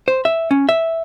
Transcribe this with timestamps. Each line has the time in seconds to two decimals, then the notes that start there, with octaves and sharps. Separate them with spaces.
0.08 C5
0.25 E5
0.51 C#4
0.69 E5